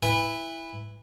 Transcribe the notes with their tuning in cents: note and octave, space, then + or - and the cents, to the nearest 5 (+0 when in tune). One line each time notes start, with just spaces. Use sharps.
E4 +0 B4 +0 G#5 -40